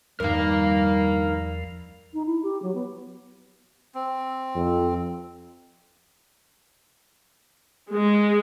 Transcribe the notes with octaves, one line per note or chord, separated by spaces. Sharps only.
E2 G2 D#3 F3 G3 A#4 F5
D#4
E4
G4
F#3
B3
C4
F2
G#3